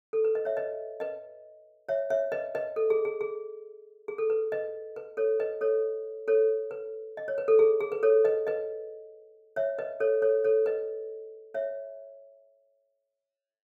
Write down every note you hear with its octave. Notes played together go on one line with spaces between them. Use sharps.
A4
B4
B4 D#5
C#5 E5
B4 D#5
B4 D#5
C#5 E5
C#5 E5
B4 D#5
B4 D#5
A4
G#4
G#4
G#4
G#4
A4
B4
B4 D#5
B4
A4 C#5
B4 D#5
A4 C#5
A4 C#5
B4
D#5
C#5
B4
A4
G#4
G#4
B4
A4 C#5
B4 D#5
B4 D#5
C#5 E5
B4 D#5
A4 C#5
A4 C#5
A4 C#5
B4 D#5
C#5 E5